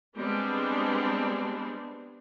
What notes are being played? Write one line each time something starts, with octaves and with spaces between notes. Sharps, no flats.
G3 G#3 B3 C4 D4